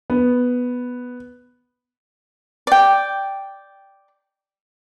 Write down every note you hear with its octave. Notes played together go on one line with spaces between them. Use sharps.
B3
D5 G5